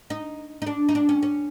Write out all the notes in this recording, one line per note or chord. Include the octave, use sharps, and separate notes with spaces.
D#4
D#4
D4
D#4
D4
C#4
C#4